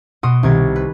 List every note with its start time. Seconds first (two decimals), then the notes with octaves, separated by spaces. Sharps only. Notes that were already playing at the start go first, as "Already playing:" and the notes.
0.23 B2 F#4 C6 D#6 D7 E7
0.43 C2 D#3 G#6 A6
0.76 B4